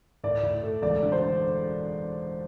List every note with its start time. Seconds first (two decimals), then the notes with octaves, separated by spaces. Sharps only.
0.24 A2 D5
0.43 A2
0.63 A3
0.82 E1 D5
1.03 D3
1.12 C5